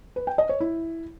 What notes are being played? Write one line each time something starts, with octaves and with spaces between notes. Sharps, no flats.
B4
G5
D#5
C#5
E4